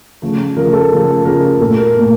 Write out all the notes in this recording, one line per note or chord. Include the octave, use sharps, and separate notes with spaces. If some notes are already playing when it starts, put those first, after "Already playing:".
C#3 F3 A3
C#3 F3 A3 A#4
A4
C#3 F3 A3
C#3 F3 A3 A#4
A#2 A3 A4
A#4
A#2 A3